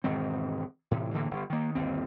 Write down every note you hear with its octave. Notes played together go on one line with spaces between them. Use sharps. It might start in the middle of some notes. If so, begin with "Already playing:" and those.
E1 G#2 D#3 C4
A2 C3 E3
A2 D3 E3 A#3
G1
D#3 A#3
G1 D#2 C4